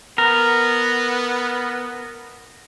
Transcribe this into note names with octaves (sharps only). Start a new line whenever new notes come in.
B3 A#4